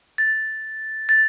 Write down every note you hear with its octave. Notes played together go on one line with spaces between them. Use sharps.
A6
A6